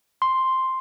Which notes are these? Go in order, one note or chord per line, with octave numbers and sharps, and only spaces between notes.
C6